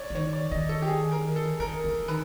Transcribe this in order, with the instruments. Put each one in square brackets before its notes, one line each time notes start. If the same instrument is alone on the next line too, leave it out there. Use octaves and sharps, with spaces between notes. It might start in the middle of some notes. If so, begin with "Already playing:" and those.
Already playing: [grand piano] C#5 D5
[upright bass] E3
[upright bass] D#3 [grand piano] C#5
[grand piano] D5
[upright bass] D#3 [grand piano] D#5
[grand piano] A4
G4
G#4
A#4
A4
[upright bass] D#3 [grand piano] A#4
[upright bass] E3
[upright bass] D#3 [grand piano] B4